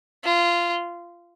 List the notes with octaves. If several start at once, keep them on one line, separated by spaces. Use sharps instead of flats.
F4